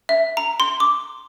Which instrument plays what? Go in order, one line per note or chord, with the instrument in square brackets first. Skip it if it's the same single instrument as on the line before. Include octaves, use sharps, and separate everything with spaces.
[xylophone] E5
A#5
C6
D6